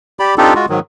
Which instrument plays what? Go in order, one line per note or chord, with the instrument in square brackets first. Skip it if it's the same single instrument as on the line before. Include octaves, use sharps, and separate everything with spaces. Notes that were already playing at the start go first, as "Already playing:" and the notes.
[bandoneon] G4 D5 B5
C4 D4 D#4 F4 G4 A4
G#3 F4 F#4
G#2 D#3 F#3